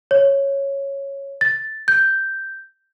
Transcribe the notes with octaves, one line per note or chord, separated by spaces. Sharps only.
C#5
A6
G6